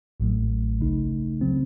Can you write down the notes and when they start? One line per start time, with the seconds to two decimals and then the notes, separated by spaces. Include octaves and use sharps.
0.20 A1 A2 F#3 A3
0.81 C#2 C#3 A3 D#4
1.41 C#3 F#3 C4